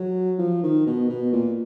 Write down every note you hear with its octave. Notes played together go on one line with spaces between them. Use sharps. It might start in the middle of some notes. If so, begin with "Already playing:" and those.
Already playing: F#3
F3
D#3
B2
B2
A#2